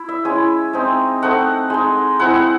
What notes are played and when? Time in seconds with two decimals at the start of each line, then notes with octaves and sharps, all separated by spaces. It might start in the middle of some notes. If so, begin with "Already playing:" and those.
Already playing: E4
0.09 E5
0.25 G#3 C#4 E4 G#5
0.73 G#3 C4 D#4
1.22 A3 C4 D#4 F#5
1.70 G#3 D#4
2.20 G#3 C4 E4 F#5
2.35 F#5